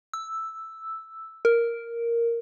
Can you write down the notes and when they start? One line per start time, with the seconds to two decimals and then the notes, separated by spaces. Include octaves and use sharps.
0.14 E6
1.45 A#4